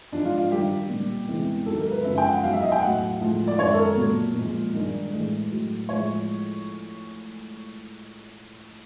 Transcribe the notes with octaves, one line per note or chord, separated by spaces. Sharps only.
G#2 F3 G#3 D4
F4
F4
G2 D#3 G3 G4
A#2 G3
E2 C3 E3 G#3
G#2 D#3 F#3 A4
A#4
B4
F#2 C#3 F3 G#3 E5
G5
F#5
E2 B2 F#3 F5
E5
D#5
G5
A2 F#3 F#5
A2 F3 G#3
D5
F#2 D#3 G#3 C#5
A4
A#4
A#2 F#3
A#2 F3 G#3
G2 D#3 G#3
A2 E3 G#3
A2 F#3
A2 F3 G#3 C#5